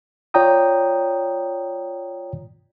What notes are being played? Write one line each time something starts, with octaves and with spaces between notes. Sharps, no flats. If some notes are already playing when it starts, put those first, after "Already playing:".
F4 C#5 D5 G5 A#5 D#6